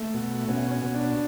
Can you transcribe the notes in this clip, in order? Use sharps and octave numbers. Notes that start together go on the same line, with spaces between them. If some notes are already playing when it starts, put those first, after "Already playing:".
Already playing: A3
B2
B2 C#4
C#4
B2
D4